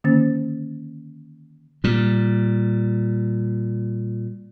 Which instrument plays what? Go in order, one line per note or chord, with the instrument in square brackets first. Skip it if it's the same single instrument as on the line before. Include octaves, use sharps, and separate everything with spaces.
[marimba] D3 D#3 A#3 C#4 C5 A6
[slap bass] A#2 G3